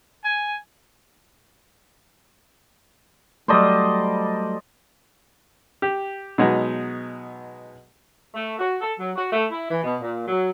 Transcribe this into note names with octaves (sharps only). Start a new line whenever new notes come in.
G#5
F#3 G3 A3 C5 D5 D#5
G4
B2 F#3 G#3 B3 D#4
A3
F#4
A4
F#3
F#4
A3
E4
E3
B2
A#2
F#3